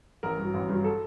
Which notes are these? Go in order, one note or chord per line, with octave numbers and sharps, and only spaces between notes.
A1 A#4
G2
F#3
A1
G2 F#3
A4